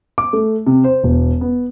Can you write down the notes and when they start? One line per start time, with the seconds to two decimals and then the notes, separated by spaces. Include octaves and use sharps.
0.18 D6
0.33 A3
0.67 C3
0.84 C5
1.04 E1
1.41 B3